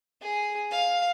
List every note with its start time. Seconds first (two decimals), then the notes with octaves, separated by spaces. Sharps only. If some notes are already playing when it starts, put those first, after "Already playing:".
0.22 G#4
0.71 F5